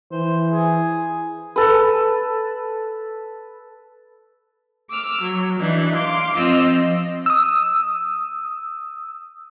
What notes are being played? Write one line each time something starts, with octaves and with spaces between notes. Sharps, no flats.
E3 C5
G#4
A4 B4
D6 E6 F6
F#3
E3 D4 D#4
F5 C6 D6
F3 C4 F4 D#5 E6
D#6 E6